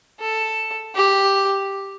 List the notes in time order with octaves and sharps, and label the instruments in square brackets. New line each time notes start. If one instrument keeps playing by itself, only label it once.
[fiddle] A4
G4